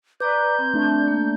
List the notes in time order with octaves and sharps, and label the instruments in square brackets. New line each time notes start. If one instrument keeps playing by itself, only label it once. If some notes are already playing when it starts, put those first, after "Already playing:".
[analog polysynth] B4 [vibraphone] D5 A#5 D6 [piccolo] G6
[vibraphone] C4
[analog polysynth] A3 D4
[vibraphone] A#3